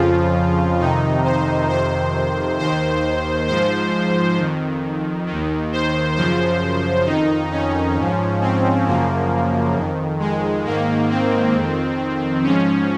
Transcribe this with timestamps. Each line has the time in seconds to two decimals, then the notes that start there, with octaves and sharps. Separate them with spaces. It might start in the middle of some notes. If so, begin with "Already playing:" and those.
Already playing: F2 C#3 F3 F4
0.79 F2 C3 D#3 D#4
1.24 C5
1.68 F2 C3 D#3 C5
2.59 D#2 D#3 C5
3.48 G#2 F3 C5
4.38 F2 D#3
5.27 D#2 D#3
5.72 C5
6.16 F#2 C#3 F3 C5
7.06 F2 D#3 D#4
7.51 C#4
7.96 G#2 F3
8.41 C4
8.86 F#2 C#3 F3 A#3
9.75 F2 D#3
10.19 G#3
10.64 G#2 D#3 A#3
11.10 C4
11.54 F2 D#3
12.44 G#2 F3 C#4